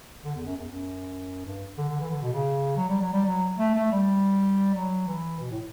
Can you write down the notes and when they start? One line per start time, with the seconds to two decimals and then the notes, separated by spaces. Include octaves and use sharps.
0.24 D3
0.35 E2
0.46 F#2
0.57 E2
0.69 F#2
1.45 G2
1.78 D3
1.89 D3
2.00 E3
2.11 D3
2.22 B2
2.32 C#3
2.77 F#3
2.89 G3
3.01 F#3
3.13 G3
3.26 F#3
3.58 A3
3.75 A3
3.92 G3
4.75 F#3
5.07 E3
5.40 B2
5.51 A2